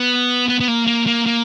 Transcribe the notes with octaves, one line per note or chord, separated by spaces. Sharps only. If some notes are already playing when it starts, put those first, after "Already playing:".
Already playing: B3
B3
B3
A#3
A#3
A#3
A#3